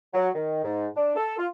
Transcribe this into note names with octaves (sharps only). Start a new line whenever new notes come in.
F#3
D#3
G#2
D4
A4
F4